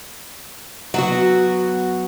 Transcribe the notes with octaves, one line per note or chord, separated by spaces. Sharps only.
F#3 B3 F#4